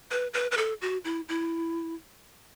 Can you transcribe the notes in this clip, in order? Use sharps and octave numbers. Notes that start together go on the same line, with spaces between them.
B4
B4
B4
A4
F#4
E4
E4